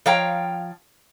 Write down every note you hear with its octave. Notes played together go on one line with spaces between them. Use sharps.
F3 C#5 F5 G5 A#5